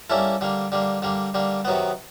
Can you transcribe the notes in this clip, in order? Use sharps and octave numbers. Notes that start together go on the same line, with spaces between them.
G3 A#3 C#4 E4 A4
D3 G3 A#3
D3 G3 A#3
D3 G3 A#3
D3 G3 A#3
C3 D#3 F#3 B3